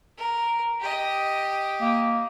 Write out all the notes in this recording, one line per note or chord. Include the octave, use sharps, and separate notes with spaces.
A#4
G4 D#5
A#3